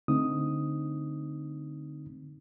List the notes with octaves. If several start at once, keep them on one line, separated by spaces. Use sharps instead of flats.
D3 A3 C4 D#4 D#6